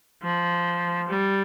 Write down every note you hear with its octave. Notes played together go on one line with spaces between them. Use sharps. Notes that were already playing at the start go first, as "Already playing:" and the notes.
F3
G3